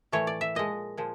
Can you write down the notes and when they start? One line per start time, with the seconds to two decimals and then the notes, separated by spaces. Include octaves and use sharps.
0.12 A2 E3 A3 C#5
0.27 D5
0.41 E5
0.55 A#2 F3 G#3 D#5
0.97 A#2 F3 G#3